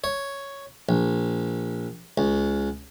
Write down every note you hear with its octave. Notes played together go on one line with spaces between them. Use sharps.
C#5
A#1
C#2